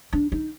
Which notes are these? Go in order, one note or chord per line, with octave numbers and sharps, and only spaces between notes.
D4
D#4